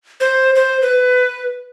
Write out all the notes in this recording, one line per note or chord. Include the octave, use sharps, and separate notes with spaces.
C5
C5
B4